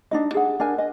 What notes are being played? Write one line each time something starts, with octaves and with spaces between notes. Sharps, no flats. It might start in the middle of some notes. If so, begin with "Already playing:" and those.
D4 D#4 D#5
G#4 F#5
D4 A#4 G#5
D#5